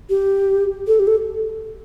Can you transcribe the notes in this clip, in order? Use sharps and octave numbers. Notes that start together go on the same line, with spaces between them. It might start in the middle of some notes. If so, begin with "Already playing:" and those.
G4
A4
G4
A4